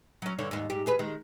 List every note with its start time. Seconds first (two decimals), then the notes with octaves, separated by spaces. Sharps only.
0.22 F#3 C#4
0.39 G2 D3 C#5
0.51 D#2 G#2
0.70 G#2 G4
0.86 E2 G#4 B4
0.99 D#3 G#3